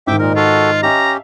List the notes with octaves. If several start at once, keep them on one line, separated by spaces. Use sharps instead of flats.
G#2 D#3 E5 G5 D6
A#2 D#4 A#4
F4 F#4 A4
C#4 G4 E5 F5 A5 A#5